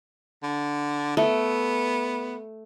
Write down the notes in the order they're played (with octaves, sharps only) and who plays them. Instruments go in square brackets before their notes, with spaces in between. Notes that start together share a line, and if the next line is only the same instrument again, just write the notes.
[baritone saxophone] D3
[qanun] A3 [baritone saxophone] B3